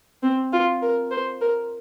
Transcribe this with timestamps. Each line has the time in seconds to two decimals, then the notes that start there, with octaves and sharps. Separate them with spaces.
0.23 C4
0.53 F4
0.82 A#4
1.11 C5
1.41 A#4